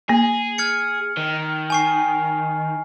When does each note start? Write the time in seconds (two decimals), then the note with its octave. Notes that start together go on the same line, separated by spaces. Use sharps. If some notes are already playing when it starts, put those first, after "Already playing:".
0.09 A#3 G#4
0.58 F6 G#6 C#7
1.17 D#3
1.70 G#5 C#6 C7